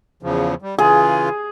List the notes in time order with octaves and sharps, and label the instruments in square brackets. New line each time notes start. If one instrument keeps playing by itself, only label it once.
[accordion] E2 C#3 F3
G3
[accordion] C#3 E3 F4 [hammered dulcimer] G#4